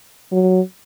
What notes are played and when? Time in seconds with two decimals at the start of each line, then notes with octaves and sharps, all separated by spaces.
0.32 F#3